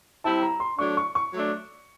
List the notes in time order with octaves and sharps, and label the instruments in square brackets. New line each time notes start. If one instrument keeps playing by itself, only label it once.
[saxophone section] G3 C4 E4 [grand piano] A5
[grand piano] A#5
C6
[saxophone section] F#3 A3 D4 [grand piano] C#6
[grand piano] C#6
C#6
[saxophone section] F#3 A3 D4